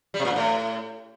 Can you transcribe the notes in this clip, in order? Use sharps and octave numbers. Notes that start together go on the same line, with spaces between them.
G3
C3
A#2
G2
A2